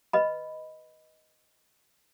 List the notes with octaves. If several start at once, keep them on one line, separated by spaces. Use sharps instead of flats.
B4 D#5 B5